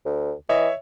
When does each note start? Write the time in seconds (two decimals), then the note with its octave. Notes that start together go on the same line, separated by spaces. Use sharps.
0.06 D2
0.49 E3 C#5 D#5 E5